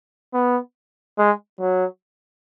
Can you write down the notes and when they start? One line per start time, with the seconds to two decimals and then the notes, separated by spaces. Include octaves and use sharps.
0.33 B3
1.18 G#3
1.60 F#3